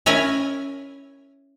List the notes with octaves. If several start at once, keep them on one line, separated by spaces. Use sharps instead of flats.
C#4 E4 A#4 E5 G#5